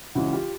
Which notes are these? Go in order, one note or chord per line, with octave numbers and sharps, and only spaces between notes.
C#2 C#3 E3 E4 F#4
F4 G4